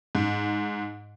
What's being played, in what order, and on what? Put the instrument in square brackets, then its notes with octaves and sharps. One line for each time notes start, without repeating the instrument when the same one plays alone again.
[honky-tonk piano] G#2